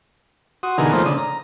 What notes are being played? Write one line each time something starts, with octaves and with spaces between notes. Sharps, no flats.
F#4 C6 D#6
B2 D3 E3 D#4 G#4 A#4
D#3 F3 A3 A#3 C5
C#3 D4 D#6
A#5